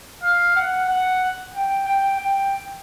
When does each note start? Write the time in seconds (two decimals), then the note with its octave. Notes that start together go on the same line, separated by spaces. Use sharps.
0.23 F5
0.56 F#5
0.89 F#5
1.54 G5
1.88 G5
2.20 G5